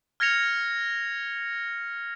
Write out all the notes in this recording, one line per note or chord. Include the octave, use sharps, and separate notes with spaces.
F6 G#6 A#6 C#7 F7